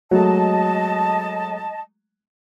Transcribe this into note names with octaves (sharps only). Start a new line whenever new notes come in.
F#3 G#3 A3 D#5 A5